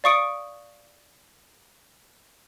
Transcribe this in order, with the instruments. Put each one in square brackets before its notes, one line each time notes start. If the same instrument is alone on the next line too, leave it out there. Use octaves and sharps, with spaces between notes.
[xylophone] D5 F5 C#6 D#6 C#7 D7